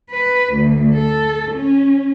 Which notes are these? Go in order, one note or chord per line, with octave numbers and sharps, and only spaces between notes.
B4
D2
A4
C#4